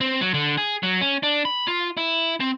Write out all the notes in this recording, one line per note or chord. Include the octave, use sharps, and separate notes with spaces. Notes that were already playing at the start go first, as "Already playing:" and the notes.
C4
F#3
D3
G#4
F#3
C#4
D4
B5
F4
E4
C4